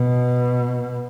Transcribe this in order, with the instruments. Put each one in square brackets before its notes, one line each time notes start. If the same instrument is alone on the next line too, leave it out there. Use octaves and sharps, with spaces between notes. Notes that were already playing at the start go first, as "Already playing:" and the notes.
Already playing: [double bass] B2